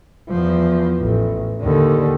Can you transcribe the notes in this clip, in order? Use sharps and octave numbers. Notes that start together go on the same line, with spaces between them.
E2 F3
A1
D#2 D3